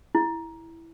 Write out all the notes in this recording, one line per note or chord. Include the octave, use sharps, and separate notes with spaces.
E4